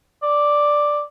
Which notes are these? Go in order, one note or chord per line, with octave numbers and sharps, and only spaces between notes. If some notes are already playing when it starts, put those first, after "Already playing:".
D5